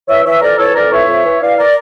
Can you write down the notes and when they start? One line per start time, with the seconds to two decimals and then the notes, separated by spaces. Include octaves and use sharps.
0.08 E3 C#5 E5
0.25 E3 C#5 E5
0.42 F2 A#4 D5
0.58 E3 A4 C#5
0.74 F2 A#4 D5
0.91 E3 C#5 E5
1.08 F2
1.25 E3
1.41 E3 D5 F5
1.58 A#4 D5